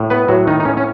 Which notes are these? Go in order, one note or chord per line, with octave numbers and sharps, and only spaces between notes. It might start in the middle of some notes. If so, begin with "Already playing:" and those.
Already playing: A2
B3 B4
A2 F#3 F#4
D#3 D#4
D#4
A2 C#4
C#4